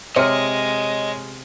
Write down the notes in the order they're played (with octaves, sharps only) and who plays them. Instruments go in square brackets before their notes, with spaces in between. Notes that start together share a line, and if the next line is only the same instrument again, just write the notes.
[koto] C3 [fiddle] G#3 [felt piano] C#5 F6 [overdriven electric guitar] D#5